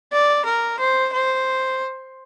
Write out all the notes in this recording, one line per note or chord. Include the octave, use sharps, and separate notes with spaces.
D5
A#4
C5
C5